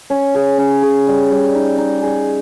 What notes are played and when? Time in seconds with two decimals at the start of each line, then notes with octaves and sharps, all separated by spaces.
0.10 C#4
0.35 G#4
0.58 C#4
0.82 G#4
1.07 G3
1.30 G3
1.55 D#4
1.78 D#4
2.02 G#4